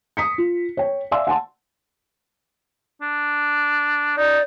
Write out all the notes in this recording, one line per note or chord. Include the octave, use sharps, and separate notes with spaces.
D#6 B6 C#7
F4
C#5 G5
D5 E5 F5 G#5 C6 E6
F#5 G#5 A5 C6
D4
D#4 D5